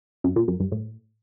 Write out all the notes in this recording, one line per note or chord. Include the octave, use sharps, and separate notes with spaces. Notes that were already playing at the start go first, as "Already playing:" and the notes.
F#2
A#2
F#2
G2
A2